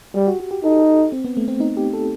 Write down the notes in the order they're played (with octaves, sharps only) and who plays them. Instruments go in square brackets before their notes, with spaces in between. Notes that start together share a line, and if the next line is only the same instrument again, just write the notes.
[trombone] G3 [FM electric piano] G4
[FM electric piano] F#4
F#4
G4
[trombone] D#4 [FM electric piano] A4
[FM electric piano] A4
C4
B3
A3
C4
D#4
G4
A4